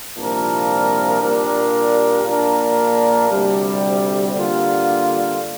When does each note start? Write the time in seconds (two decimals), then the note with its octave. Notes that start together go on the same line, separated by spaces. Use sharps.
0.17 C2 A#2 F3 D4 A#4
1.21 A#2 G3 D4 A#4
2.25 A#1 A#2 A#3 D4 A#4
3.29 D2 C3 G3
4.35 D3 G3 A#3 F4